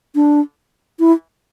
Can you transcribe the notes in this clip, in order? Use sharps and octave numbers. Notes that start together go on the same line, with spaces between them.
D4
E4